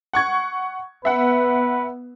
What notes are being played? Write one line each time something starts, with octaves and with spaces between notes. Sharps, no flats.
F#5 C#6 G#6
B3 B4 E5 F#5